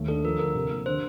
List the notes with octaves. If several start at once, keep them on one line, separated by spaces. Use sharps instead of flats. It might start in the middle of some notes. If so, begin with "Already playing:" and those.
Already playing: D#2 A3
D4 A4
F3 A#4
D3 A#4
C3
A#3
D3 C5